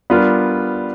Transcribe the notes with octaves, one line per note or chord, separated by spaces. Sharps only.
G3 B3 D4 F4 A#4